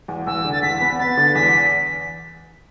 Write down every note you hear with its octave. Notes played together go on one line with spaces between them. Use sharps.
E2
E2 E6
D3
A6
E2 B6
B3
B3 A6
D3
E2 B6